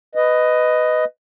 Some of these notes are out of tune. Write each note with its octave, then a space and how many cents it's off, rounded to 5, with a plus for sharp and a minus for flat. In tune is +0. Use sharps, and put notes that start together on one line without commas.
B4 +15 D#5 +0